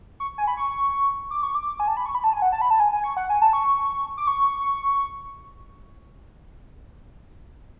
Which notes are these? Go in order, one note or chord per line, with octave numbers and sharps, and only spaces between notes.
C#6
G#5
B5
C#6
D6
C#6
D6
G#5
A5
B5
C#6
B5
A5
G#5
F#5
A5
B5
A5
G#5
G#5
C#6
F#5
G#5
A5
C#6
D6
C#6